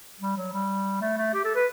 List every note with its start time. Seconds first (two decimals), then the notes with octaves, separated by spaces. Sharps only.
0.20 G3
0.36 F#3
0.52 G3
1.01 A3
1.17 A3
1.33 G4
1.44 A4
1.55 B4